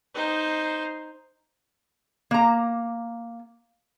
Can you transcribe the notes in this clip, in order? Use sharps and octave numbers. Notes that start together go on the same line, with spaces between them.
D#4 C5
A#3 A#5